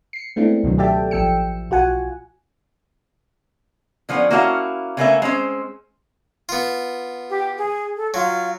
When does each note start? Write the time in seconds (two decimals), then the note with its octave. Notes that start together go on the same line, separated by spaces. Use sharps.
0.13 C7 C#7
0.36 G#3 A3 B3 C4 D4 E4
0.64 C#2 G#2 B2 D3 D#3 F#3
0.78 G4 A4 D5 E5 G5 A5
1.11 A1 F3 G5 E6 C#7
1.70 B1 F4 F#4 F#5 G#5
4.09 D3 F3 B3 C#4
4.31 A#3 C#4 E4 F#4 F5 A5
4.97 C#3 A3 A#3 C#4 B4 E5
5.22 G#3 C4 C#4 C5
6.49 B3 F4
7.30 G4
7.57 G#4
7.96 A4
8.14 F#3 F4